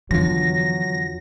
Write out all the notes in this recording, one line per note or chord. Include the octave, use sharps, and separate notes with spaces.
F2 D3 E3 F#3 B3 F4 A#6